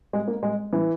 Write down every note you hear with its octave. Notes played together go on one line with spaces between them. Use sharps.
G#3
A#3
G#3
E3